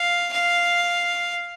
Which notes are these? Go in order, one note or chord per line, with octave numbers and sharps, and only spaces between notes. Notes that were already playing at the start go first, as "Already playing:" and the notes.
Already playing: F5
F5